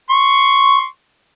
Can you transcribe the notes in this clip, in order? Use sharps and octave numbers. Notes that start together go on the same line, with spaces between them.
C6 C#6